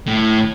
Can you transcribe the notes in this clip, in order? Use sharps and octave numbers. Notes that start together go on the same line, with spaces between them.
A2